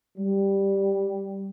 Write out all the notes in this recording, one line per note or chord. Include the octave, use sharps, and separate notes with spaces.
G3